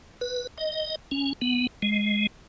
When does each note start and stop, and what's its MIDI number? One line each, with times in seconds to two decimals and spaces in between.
0.21 0.47 71
0.58 0.96 75
1.11 1.33 61
1.42 1.67 59
1.82 2.27 56